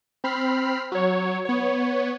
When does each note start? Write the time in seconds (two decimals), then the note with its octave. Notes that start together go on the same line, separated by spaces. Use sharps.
0.24 C4 B5 F6 C7
0.92 F#3 C#5
1.45 B3 C#5